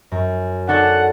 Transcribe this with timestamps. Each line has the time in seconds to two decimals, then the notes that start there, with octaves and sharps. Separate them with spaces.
0.12 F#2
0.68 D4 F#4 A4 F#5